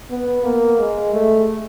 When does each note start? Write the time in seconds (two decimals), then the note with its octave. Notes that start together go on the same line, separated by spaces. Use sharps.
0.10 B3
0.44 A#3
0.79 G#3
1.13 A3